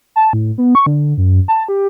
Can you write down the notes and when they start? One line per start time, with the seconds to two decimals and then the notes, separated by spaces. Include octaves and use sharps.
0.16 A5
0.33 A2
0.58 B3
0.75 C#6
0.86 D3
1.18 F#2
1.48 A5
1.68 G4